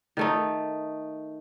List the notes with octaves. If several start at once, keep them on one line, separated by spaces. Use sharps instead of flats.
D#3 A3 D#4